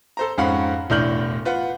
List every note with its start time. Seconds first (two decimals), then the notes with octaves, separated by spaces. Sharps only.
0.17 A4 C5 A#5
0.38 F2 G#2 C#4 F5 F#5 B5
0.90 E1 A2 D4 F6 G6 F#7
1.45 F4 B4 F#5